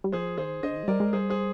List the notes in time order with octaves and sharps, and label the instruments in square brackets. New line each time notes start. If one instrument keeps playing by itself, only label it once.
[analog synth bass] G3
[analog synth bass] F3 [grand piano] G#4 C5
[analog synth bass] D#3 [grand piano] G#4 C5
[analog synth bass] D3 [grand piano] C5 D#5
[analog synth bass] D#3
G#3
[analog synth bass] G3 [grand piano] A#4 D5
[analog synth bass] G#3
[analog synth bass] G3 [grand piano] G#4 C5
[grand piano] G#4 C5